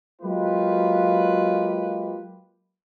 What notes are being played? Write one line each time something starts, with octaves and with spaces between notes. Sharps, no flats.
F#3 G#3 A#3 F4 G4 B4